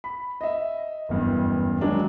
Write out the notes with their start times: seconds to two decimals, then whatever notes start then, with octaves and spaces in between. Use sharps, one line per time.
0.04 B5
0.41 D#5 E5
1.09 F#1 E2 G2
1.81 D#3 F#3 G#3 D4